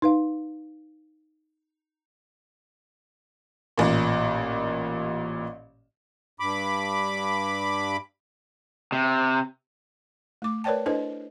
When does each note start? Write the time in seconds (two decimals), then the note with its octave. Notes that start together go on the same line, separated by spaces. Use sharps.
0.02 D#4 B4 F5
3.78 A1 A#2
6.40 G2 B5 D6
8.92 C3
10.42 A3 D6
10.64 A#4 B4 C#5 D5 G5 A5
10.86 D4 E4 A4 B4 C5 D#5